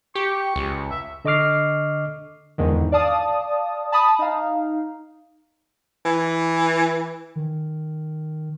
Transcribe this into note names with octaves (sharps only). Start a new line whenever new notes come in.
G4 C#6
C#2
E5
D3 D#5 C#6 D6 F6 C7
E2 G#2 D3 D#3
D5 F5 A5 D#6
A5 B5 D#6
D#4 F5
E3
D#3